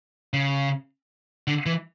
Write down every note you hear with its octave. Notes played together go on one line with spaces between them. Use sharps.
C#3
D3
E3